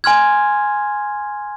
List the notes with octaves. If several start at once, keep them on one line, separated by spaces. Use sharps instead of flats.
G#5 C6 F6 G#6